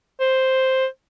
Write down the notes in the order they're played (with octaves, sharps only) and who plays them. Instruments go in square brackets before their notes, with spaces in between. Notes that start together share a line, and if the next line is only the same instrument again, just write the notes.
[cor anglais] C5